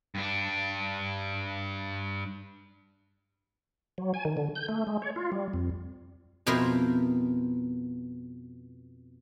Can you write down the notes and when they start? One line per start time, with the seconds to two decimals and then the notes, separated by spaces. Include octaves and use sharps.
0.15 G2 D4
3.98 F#3
4.14 G#5
4.25 D#3
4.37 D3
4.55 G6
4.69 A3
4.87 G#3
5.02 C#5
5.16 F4
5.32 G3
5.54 F2
6.46 F2 B2 E4 A#4 C5